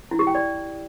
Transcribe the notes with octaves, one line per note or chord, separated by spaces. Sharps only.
E4
G4
G5
D5